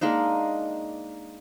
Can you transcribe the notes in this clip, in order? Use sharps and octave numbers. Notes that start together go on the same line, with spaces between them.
G#3 A#3 D4 D#4